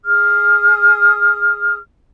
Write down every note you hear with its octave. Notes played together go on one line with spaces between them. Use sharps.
G#4 D#6 F6